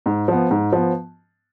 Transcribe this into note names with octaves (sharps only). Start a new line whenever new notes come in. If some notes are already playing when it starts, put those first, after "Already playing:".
G#2
F3 B3
G#2
F3 B3